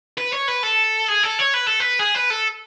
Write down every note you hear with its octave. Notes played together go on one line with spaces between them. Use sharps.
B4
C#5
B4
A4
G#4
A4
C#5
B4
A4
B4
G#4
B4
A4